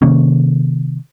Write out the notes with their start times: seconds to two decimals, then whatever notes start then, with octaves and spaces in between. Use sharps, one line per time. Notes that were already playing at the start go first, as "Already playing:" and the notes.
0.02 C3 D#3 A#3 C#4